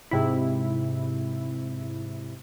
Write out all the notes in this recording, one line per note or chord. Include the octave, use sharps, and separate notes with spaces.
G#2 C3 E4